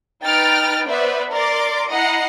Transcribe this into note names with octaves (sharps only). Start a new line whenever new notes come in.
D#4 B4 G5 F6 A6 D7
B3 B4 C5 D5 E5
A#4 D5 C6 D6 A6
E4 D#5 F#5 A#5 C7